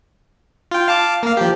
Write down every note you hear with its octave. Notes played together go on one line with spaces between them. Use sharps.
F4 G5
F5 A5 D6
A#3 F5
F3 G4